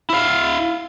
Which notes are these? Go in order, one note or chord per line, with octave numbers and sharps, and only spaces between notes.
E4 F5